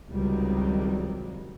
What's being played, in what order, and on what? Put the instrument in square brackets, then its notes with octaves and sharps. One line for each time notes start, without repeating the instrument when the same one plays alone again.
[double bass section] C#2 C3 D#3 F#3 G3